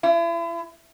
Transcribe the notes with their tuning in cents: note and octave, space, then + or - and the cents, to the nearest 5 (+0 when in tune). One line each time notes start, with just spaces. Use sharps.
E4 +40